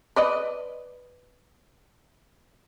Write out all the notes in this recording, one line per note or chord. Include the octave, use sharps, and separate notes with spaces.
B4 D5 D#5